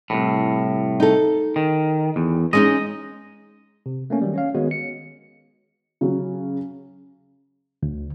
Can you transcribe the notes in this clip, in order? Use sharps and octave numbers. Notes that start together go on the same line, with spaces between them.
C2 F2 A2
D#4 A4
D#3
E2
G#3 C#4 D#4 D#5
C3
A3 A#3 C#4
D#3 F#3 G3
C#4 C#5 F5
D#3 G#3 B3 F#4 C#5
C#7
C#3 F#3
D2